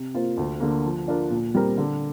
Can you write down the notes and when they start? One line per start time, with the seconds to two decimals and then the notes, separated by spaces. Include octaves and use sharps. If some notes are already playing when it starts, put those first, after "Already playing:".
Already playing: C3
0.14 A#3 F4 C5
0.37 D2
0.60 D3 A#3
0.84 F3
1.08 D4 F4 A#4
1.30 A#2
1.55 G3 C4 A#4
1.78 D3